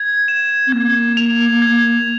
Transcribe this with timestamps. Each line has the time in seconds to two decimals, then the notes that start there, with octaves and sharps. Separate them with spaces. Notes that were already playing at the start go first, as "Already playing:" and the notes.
Already playing: G#6
0.28 E7
0.67 C4
0.72 A#3 G#6
1.17 F7
1.62 G#6